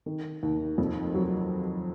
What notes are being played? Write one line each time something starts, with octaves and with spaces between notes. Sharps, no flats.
D#3
D#2
F2
F#3